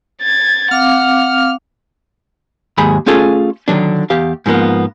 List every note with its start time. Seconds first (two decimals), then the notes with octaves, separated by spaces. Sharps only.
0.22 G#6 A6
0.71 C4 F5 F#5 D6 F6
2.77 D#2 G#2 F#3 G#4 B5
3.06 A3 C#4 F4 G#4 A4
3.68 D3 D#3 F#3 D4
4.10 E2 G4 F5
4.46 G#2 F3 A#3 B3